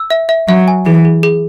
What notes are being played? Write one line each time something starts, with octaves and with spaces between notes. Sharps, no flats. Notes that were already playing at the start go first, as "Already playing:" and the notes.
Already playing: E6
E5
E5
F#3 E5
G#5
E3 G#4
G#4
G#4